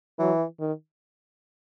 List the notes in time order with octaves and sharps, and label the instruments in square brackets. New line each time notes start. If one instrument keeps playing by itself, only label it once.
[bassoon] E3 [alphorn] F#3
[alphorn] D#3